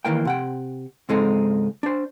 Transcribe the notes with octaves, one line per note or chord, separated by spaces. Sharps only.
D#3 E3 A#3 G5
C3 F#5 G5
C#2 G#2 G#3 C4 D#4 A4
D4 C5